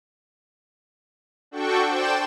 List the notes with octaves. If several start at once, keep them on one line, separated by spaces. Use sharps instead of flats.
D4 F#4 A4 G5 C#6
C5 D5 G5 A5 E7